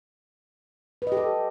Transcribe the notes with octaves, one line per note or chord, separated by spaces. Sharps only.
G4 A4 B4 D#5